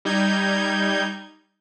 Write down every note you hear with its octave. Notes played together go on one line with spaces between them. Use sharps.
G3 D#4 G6 G#6